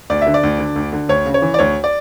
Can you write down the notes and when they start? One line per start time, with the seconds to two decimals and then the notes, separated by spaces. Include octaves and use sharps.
0.10 D2 D5
0.22 D3 E5
0.34 D5
0.43 D2
0.59 D3
0.76 D2
0.93 D3
1.09 D2 C#5
1.26 C#3
1.34 C#5
1.42 E3
1.54 D5
1.59 D2 C#5
1.84 D5